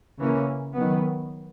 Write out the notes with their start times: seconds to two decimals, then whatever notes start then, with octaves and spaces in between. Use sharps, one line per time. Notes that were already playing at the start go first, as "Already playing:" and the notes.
0.18 C#3 E3 A#3 C#4
0.74 D#3 F#3 B3